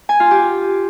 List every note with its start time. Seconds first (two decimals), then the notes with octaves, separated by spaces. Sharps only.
0.09 G#5
0.20 F4
0.31 G4